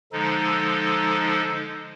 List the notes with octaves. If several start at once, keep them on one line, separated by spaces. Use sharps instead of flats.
D3 F3 G#3 D#4 A4